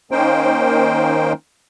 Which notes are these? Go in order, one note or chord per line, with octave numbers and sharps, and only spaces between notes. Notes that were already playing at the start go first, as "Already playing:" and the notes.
D#3 A#3 C#4 D#4 C5 G5